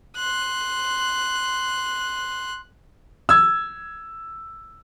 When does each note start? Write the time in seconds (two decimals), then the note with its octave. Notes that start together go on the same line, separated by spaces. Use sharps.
0.17 C6 F#6
3.29 E6 G#6